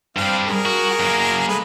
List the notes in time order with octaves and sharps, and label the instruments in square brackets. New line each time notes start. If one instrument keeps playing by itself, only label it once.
[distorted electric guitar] G2 G3 [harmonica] C4 F5
[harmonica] G#4 A#4
[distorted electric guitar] F#4
F#2 A#3
[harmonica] G#3 A3 B4